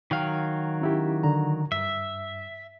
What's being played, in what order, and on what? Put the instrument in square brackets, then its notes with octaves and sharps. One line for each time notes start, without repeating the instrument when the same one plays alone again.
[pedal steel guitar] D#3 F#3 F5 [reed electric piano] G5
[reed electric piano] C#4 E4 G4
D3 A#5
[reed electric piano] G2 [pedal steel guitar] E5